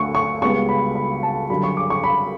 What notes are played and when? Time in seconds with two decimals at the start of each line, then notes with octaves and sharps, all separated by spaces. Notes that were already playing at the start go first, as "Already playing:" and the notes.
Already playing: D2 D3 A3 C#6
0.15 C#6
0.42 C#2 C#3 G3 B3 C#6
0.69 B5
0.95 B5
1.23 A5
1.50 F#2 D3 G3 B5
1.64 C#6
1.77 D6
1.90 C#6
2.04 B5